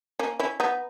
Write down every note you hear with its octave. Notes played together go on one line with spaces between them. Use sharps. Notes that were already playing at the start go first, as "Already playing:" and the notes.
A#3 C#4
C#4 E4
B3 D#4